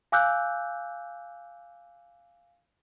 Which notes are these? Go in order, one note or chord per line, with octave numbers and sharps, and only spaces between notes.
F5 G#5 D6 E6 F#6 G6